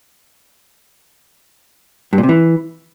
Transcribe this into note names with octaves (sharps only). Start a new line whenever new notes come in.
G2
A#2
C3
E3